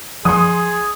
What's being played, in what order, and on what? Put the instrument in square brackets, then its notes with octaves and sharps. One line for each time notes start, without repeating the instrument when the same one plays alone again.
[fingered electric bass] F3 [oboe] G#4 [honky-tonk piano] C6 D#6